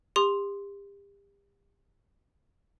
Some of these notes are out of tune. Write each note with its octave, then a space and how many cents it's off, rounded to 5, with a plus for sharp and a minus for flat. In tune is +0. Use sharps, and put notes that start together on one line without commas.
G4 +35 C6 +0 D#6 -40